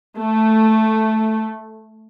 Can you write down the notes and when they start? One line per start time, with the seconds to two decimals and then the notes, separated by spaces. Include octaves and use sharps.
0.20 A3